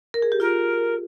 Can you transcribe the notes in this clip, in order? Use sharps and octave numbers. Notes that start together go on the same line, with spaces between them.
A#4
G#4
G4
F4 A#4